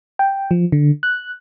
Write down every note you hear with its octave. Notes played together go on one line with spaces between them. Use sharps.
G5
F3
D3
F#6